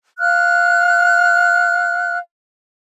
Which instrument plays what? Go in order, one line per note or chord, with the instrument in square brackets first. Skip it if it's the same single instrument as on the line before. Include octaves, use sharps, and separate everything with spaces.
[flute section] F5 F6 F#6